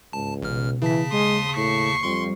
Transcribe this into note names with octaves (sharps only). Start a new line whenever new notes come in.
C#2 G#2 A5
A1 B2 F6
C#3 E3 A5 B6
D#2 G#3 C6 D#6
A2 C#6 C7
F2 F3 G3 C6